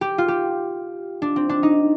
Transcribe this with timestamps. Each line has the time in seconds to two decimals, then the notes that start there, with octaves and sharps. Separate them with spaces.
0.01 G4
0.18 F4
0.28 G4
1.22 D4
1.36 C4
1.49 D4
1.63 D#4